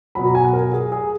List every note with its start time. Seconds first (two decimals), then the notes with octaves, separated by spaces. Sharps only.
0.15 B2 F#3 B5
0.25 A#5
0.35 G#5
0.45 F#5
0.53 A#4
0.73 G#4
0.92 G#4